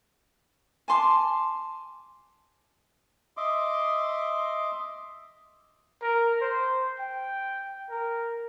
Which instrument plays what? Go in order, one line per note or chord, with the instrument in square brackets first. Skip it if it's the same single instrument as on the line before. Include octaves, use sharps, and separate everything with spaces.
[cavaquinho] G#5 A5 C6 D6
[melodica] D#5 E5 C6 D6
[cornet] A#4
C5
G5
A#4